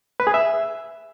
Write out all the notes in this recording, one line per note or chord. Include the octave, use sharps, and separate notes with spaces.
B4
G#4
E5